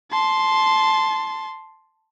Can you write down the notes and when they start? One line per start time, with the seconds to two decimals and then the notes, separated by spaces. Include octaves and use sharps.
0.11 A5 C6